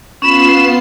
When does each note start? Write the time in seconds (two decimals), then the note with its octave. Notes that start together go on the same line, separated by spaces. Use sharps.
0.22 B3 C#4 F4 B5 C7 E7